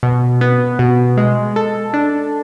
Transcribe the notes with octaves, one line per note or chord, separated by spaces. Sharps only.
B2
B3
B2
G#3
A4
D4